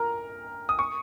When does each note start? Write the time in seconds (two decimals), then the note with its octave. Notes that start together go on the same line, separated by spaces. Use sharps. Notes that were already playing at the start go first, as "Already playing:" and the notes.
Already playing: A#4 A#5
0.69 D#6
0.79 C#6